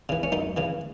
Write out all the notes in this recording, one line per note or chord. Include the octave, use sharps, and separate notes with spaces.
C#3 E3
C#4
F#2 D#4
C#3 E3